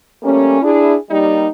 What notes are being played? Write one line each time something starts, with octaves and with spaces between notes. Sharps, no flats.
G3 A3 A#3 C#4
D4 E4 G#4
G3 A#3 D#4